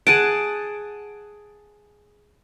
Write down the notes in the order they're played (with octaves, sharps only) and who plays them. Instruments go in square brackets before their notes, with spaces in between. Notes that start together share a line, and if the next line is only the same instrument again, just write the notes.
[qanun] G#4 F#5 A5 [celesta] D7 D#7